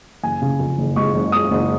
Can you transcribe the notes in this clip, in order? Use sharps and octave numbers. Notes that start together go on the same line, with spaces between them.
F#1 G#5
C#3
F2
F#1
G#3 C#6
F#1
G#3 D#6
F#1